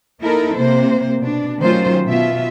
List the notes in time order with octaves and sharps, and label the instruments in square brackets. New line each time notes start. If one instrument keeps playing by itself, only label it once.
[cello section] A#3 D#4 E4 A4 A#4
C3 A#3 C5
B2 D4
D#3 F#3 A3 C#4 F4 C5
B2 F4 E5